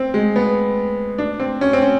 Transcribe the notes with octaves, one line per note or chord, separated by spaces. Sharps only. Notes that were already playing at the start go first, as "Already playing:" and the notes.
Already playing: C4
G#3
B3
D4
C4
C#4
C4
C#4